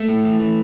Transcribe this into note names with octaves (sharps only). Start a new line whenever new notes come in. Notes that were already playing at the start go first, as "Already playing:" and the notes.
Already playing: A3
A2
E3
E3